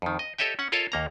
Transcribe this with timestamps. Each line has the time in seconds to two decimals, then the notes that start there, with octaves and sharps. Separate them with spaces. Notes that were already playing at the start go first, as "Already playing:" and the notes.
0.02 F2 D#3
0.19 D#5
0.38 G4 A4 C#5 D#5 E5 G5
0.59 C#4 F#5
0.72 F4 A4 A#4 C#5 D#5 F5
0.92 D#2 A#3 A#5